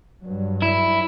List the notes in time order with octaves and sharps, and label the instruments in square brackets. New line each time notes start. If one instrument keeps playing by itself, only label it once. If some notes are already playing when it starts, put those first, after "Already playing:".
[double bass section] G2 F#3
[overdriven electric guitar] E4